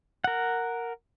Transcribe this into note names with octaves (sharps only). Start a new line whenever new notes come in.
A#4 F#5